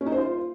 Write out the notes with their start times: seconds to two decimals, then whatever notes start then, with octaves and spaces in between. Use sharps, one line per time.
0.01 C#4
0.06 D#4
0.12 C5
0.18 F4